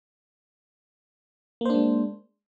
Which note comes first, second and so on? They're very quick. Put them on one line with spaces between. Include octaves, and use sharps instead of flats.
A#3 C5 D4 G#3